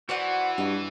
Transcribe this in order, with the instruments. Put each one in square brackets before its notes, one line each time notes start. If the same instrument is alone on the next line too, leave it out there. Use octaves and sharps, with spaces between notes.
[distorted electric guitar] E3 [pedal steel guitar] F#4 [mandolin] C5 D5 F#5
[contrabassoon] G2 [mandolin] D#5